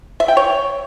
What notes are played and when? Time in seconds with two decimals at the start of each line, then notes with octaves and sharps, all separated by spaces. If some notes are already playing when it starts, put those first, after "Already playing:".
0.20 E5
0.28 G5
0.37 C#5